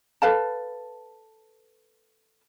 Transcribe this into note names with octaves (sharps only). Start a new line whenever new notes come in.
A4 B4 F5 A5